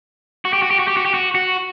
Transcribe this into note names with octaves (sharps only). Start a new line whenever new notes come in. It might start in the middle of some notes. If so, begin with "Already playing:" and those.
F#4
G4
F#4
G4
F#4
G4
F#4
G4
F#4
F#4